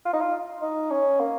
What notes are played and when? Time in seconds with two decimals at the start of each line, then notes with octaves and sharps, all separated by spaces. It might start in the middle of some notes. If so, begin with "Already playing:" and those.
0.05 F4
0.13 D#4
0.21 F4
0.62 D#4
0.91 C#4
1.20 A#3